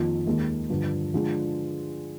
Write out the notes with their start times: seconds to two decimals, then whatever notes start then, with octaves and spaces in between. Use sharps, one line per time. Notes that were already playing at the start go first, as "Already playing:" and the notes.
Already playing: F2 D#3 A#3 F4
0.26 D#2 D#3 G#3
0.70 G2 D3 F3
1.14 D3 F3 G#3 D4